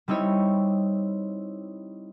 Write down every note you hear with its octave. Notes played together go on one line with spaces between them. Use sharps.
G3 C4 D#4 E4 C#5